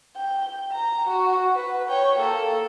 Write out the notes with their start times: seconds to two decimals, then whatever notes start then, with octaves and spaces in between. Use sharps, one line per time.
0.16 G5
0.72 A#5
1.08 F#4
1.56 B4
1.89 C#5 G5
2.19 A#3 A4